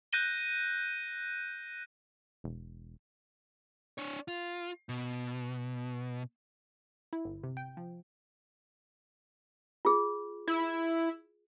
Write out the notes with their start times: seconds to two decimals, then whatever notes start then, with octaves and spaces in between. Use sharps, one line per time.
0.13 F#6 G6 A#6 D#7 G7
2.44 E1
3.98 D4 C#5
4.28 F4
4.89 B2
7.13 E4
7.25 G1
7.43 C3
7.57 G5
7.77 F3
9.85 F4 G#4
10.48 E4